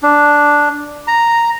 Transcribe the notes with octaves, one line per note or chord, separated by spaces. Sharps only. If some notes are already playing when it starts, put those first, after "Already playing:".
D4
A#5